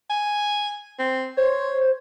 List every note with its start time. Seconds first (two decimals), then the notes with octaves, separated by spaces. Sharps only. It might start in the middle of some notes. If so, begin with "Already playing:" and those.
0.10 G#5
0.99 C4
1.37 C5 C#5